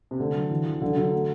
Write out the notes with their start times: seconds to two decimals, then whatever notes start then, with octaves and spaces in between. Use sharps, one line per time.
0.11 C3
0.20 D3 A3
0.34 F#3
0.50 E3
0.66 E3
0.82 D3 F#3
0.97 D3 F#3
1.12 A3